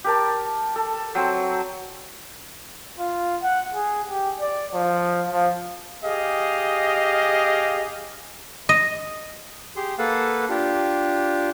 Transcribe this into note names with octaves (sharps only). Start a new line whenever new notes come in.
G4 A#4 A5
A4
F#3 C4
F4
F#5
G#4
G4
D5
F3
F3
G4 G#4 D#5 F5
D#5
G4 G#4 C6
A#3 A4 B4 F5 F#5 A5
D4 F4 G4